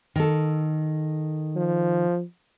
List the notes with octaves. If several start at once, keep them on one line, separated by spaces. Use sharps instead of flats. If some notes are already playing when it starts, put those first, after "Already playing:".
D#3 A4
F3